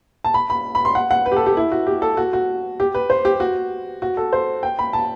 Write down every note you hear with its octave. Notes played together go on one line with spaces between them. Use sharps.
A5
B5
B5
B5
C6
F#5
F#5
B4
G4
A4
G4
E4
F#4
G4
A4
F#4
F#4
G4
B4
C5
G4
F#4
F#4
A4
C5
G5
B5
A5